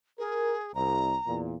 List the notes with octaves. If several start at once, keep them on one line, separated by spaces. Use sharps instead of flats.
G#4 A#4
C2 A#5
E2 A#2